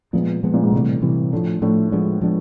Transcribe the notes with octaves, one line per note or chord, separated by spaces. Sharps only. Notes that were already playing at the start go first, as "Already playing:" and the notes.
A#2 F3 G#3 B3
F3 G#3 B3
A#2
G#2
A2 C3 E3 G3
C3 E3 G3
A2 F3 A3 D4
A2 F3 A3 D4
F3 G#3 B3 D4
F3 G#3 B3 D4